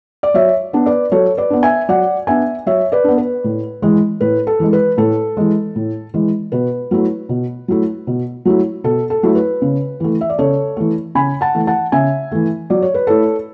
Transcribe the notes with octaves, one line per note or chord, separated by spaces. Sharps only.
D5
F#3 C#5 E5
B3 D4
B4 D5
F#3 A4 C#5
B4 D5
B3 D4
E5 G#5
F#3 D5 F#5
B3 D4 E5 G#5
F#3 C#5 E5
B4 D5
B3 D4
B4
A2
E3 G#3
A2 B4
A4
E3 G#3
B4
A2 A4
E3 G#3
A2
E3 G#3
B2 B4
F#3 A3 E4
B2
F#3 A3 E4
B2
F#3 A3 E4
B2 A4
A4
F#3 A3 E4
B4
C#3
E3 A3
E5
D5
C#3 A4 C#5
E3 A3
C#3 G#5 B5
F#5 A5
E3 A3
F#5 A5
C#3 E5 G#5
E3 A3
F#3 D5
C#5
B4
A3 E4 A4 C#5